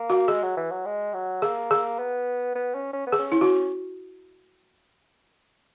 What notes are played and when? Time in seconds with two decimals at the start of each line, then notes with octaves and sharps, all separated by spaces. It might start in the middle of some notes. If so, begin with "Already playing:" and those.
Already playing: A#3
0.10 F#4
0.28 G#3 G#4
0.43 F#3
0.57 E3
0.71 F#3
0.86 G#3
1.14 F#3
1.42 A#3 G#4
1.71 G#4
1.99 B3
2.55 B3
2.74 C#4
2.93 C#4
3.07 B3
3.12 G#4
3.19 C#4
3.32 E4
3.41 F#4